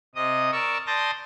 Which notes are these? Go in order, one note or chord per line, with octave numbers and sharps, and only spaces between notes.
C3 D#5 D#6
A#4 D5 C#6 E6
D5 A5 C6 D#6 G6 A#6